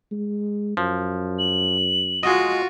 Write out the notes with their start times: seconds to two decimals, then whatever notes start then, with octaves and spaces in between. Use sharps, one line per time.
0.12 G#3
0.77 F#2 F3
1.39 F#7
2.23 G#3 F4 F#4 D#5